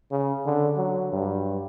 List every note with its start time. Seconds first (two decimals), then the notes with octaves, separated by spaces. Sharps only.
0.11 C#3
0.46 D3
0.77 F#3
1.12 G2